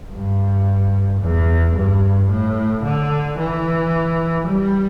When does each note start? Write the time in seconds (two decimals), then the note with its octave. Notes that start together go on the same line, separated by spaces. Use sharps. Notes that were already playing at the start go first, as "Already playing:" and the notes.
0.12 G2
1.21 E2
1.76 G2
2.30 A2
2.84 D3
3.39 E3
4.47 G3